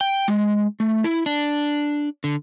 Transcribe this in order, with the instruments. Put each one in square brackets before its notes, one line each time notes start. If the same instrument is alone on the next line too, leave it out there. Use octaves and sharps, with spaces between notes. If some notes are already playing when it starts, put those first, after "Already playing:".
[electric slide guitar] G5
G#3
A3
E4
D4
D3